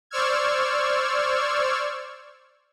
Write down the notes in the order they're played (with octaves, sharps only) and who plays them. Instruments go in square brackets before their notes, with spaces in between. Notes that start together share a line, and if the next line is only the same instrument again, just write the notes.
[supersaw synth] C5 D5 C#6 E6 F6 G#6